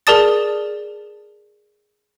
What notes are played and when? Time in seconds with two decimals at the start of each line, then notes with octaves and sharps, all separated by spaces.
0.07 G#4 A#4 D5 A5 D#6 A6